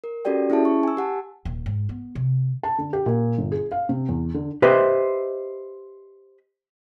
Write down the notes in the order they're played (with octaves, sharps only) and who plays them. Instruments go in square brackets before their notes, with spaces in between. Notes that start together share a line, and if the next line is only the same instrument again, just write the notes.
[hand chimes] A#4
C#4 F#4 G4 A4 D5 G5
C#4 E4 G#4 E5 A5
C#6
G#5 E6
G4 F#5 A5
[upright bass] D#1
G#2
B3
C3
[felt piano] A5
D3
G4
A#2
G1
G#4
F5
C3
E2
D3
[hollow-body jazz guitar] G4 B4 C5 D#5 E5